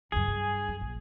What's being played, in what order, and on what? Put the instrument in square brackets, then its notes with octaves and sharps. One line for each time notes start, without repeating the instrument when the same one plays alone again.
[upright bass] C#2 F#2 [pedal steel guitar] G#4
[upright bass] G2
F#2
A#1